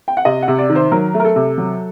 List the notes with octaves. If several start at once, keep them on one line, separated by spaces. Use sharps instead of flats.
G5
F#5
C3 D#5
F#5
C3
D5
D#3
C5
F#3 A#4
A3
A#4
A4
C3
F#3